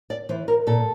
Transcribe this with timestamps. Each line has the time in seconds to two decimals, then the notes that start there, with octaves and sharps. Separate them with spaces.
0.10 D5
0.29 E3 C5
0.48 A#4
0.67 A#2 A4